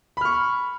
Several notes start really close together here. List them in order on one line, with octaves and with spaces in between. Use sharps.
B5 F6 C#6